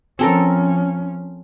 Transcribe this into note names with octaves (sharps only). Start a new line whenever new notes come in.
F3 C4 C#4 A4 A#4